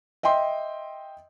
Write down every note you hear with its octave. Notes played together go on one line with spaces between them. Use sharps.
D#5 E5 G5 C6